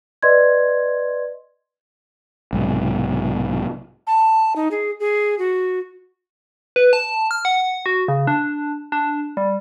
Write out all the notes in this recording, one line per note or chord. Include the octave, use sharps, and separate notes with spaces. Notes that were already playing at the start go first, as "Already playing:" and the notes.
B4 D5 D#5 C6 G#6
B1 G#2 C3
A5
D#4
G#4
G#4
F#4
B4
A5
F6
F#5
F#4
C#3
D4
D4
G3